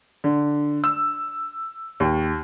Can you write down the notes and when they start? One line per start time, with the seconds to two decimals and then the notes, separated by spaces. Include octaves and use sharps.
0.24 D3
0.84 E6
2.00 D#2